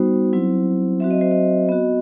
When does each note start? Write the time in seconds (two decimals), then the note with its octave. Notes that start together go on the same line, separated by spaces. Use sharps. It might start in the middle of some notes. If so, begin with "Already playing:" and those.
Already playing: G3 B3 D#4 F#4 C5
0.33 F#3 C4 E4
1.00 F#3 C4 F#4 E5
1.11 D#5
1.21 C5
1.31 D#5
1.69 B3 F#4